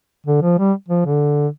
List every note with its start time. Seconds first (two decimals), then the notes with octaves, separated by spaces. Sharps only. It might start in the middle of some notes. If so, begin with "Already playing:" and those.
0.27 D3
0.42 F3
0.58 G3
0.89 F3
1.05 D3